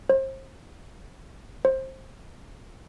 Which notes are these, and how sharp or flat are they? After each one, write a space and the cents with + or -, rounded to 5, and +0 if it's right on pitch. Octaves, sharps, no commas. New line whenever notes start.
C5 +35
C5 +20